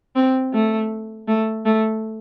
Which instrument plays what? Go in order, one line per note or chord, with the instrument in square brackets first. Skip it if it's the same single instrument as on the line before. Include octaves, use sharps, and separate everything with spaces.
[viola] C4
A3
A3
A3